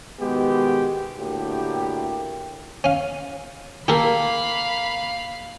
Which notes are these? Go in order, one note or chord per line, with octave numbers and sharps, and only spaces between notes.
B2 D#3 G#3 B3 F#4 G4
A2 D3 A#3 F#4 G4
C#4 F5
A#3 G4 A4 A#4 F5 B5